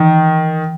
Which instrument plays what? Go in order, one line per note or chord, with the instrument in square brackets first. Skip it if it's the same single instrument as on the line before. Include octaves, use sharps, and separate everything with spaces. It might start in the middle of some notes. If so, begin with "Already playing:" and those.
Already playing: [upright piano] D#3 [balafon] E3